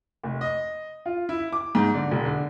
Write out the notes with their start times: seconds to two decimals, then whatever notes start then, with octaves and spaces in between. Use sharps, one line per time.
0.24 F1
0.41 D#5
1.06 F4
1.29 E4
1.52 D6
1.75 G#2
1.94 D3
2.11 E1
2.25 D3